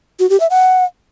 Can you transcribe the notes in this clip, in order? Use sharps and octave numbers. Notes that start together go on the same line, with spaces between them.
F#4
G4
E5
F#5